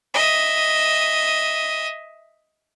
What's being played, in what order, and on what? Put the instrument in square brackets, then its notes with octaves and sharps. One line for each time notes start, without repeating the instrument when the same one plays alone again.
[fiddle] D#5 E5